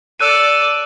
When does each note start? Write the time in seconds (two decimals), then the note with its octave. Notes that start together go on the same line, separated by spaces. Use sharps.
0.20 A4 D5 E6 F#6 D#7